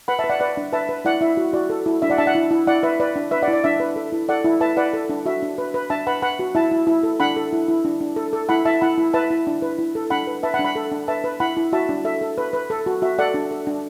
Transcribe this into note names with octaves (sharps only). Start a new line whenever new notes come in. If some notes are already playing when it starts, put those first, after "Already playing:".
B4 F#5 B5
E5 A5
B4
D5 F#5
B4 D5 F#5
D4
B4 E5 A5
B4
E4 D5 F#5
E4 E5
F#4
F#4 D5
A4
E4
D4 E5
D5 F#5
D4 E5 A5
D5 F#5
E4
E4
E4 D5 F#5
B4 E5
B4 D5
D4
B4 E5
D5 F#5
E4
D5
D4 E5
B4
A4
E4
A4 D5 F#5
E4
B4 E5 A5
B4 D5 F#5
A4
D4
F#4 E5
D4
B4
B4
D4 E5 A5
B4 F#5 B5
B4 F#5 B5
F#4
E4 E5 A5
E4
E4
A4
D4 F#5 B5
A4
E4
E4
D4
D4
A4
A4
E4 F#5 B5
E4 E5 A5
E4 F#5 B5
E4
B4 E5 A5
E4
D4
B4
E4
A4
D4 F#5 B5
B4
B4 E5 A5
F#5 B5
D4
F#5 B5
A4
D4
B4 E5 A5
B4
E4 F#5 B5
E4
F#4 E5 A5
D4
A4 E5
A4
B4
B4
A4
F#4
F#4 E5
A4 D5 F#5
D4
A4
D4